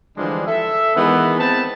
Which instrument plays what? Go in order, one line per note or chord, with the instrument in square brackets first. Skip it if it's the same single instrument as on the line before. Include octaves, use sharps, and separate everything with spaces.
[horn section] D3 E3 F3 G3 G#3 D4
A4 E5
D#3 E3 G#3 B3
B3 C4 B4 A5